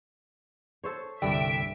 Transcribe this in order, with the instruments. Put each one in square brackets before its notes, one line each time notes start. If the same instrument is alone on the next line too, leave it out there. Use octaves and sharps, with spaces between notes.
[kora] A4 C5 C#5
[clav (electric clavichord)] C2 D3 [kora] G2 [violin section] E5 D7 [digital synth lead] G5